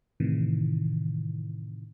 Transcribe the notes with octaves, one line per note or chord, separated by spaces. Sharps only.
A2 C3 D#3 E3